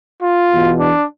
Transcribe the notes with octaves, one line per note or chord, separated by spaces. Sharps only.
F4
E2 B2
D4